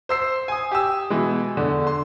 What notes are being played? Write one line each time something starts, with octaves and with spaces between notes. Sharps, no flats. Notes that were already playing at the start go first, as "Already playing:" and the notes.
C5 E6 C7
G#5 D#6
G4 E6
B2 E3 G#3
E2 D3
C6